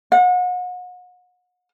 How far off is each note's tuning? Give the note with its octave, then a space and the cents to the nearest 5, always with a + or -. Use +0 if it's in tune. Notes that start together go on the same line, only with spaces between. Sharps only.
F#5 -35